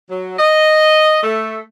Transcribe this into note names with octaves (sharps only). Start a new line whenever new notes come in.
F#3
D#5
A3